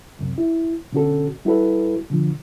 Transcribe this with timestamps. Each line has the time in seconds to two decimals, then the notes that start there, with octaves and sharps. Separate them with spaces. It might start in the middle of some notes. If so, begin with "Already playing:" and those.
0.19 C#2 F#2 C3
0.38 E4
0.93 B2 D3 C#4 F#4 A4
1.45 G3 E4 F#4 A4 B4
2.10 B2 D3 F3